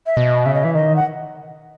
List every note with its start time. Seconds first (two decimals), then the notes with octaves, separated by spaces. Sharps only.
0.06 E5
0.17 B2 D#5
0.45 C#3 E5
0.54 D#5
0.63 E3 E5
0.75 D#3 D#5
0.96 F#5